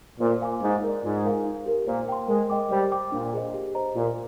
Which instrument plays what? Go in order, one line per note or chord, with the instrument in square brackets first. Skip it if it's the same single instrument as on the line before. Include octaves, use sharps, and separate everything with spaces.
[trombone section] A#2 [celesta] C5
[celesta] F5 G#5 D6
[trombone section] G#2 [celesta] D#4
[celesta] A#4 D5
[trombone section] G#2 [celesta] F4
[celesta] A#4 F5 G#5
D#4
G4 A#4
[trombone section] A#2 [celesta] C5
[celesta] G5 C6
[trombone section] G#3 [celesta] A#4
[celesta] D#5 G5 D6
[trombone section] G3 [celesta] C5
[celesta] G5 D6
[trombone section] A#2 [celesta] D4
[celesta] G#4 C5 D#5
G4
C5 D#5 A#5
[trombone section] A#2 [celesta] F4